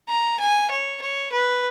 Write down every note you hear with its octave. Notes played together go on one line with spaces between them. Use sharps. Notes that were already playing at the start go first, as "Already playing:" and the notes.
A#5
G#5
C#5
C#5
B4